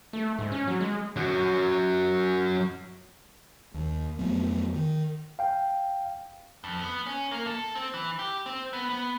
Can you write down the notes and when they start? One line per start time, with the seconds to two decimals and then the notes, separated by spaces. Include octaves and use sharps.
0.13 A3
0.39 G#2
0.52 C#4
0.68 F#3
0.81 G#3
1.16 F#2 F#3
3.74 D#2
4.19 F2 F#3 A3 B3
4.74 D#3
5.39 F5 G5
6.64 F2
6.82 B3
7.06 C#4
7.31 A#3
7.47 A4
7.75 C4
7.94 E3
8.19 G4
8.46 C4
8.73 B3
8.89 B3